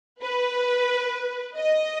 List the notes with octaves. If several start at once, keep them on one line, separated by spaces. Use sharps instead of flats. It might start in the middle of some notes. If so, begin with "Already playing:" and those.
B4
D#5